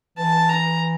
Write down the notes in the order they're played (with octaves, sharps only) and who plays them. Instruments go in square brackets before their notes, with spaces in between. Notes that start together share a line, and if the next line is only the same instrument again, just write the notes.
[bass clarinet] E3 [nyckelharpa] A5
[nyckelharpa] A#5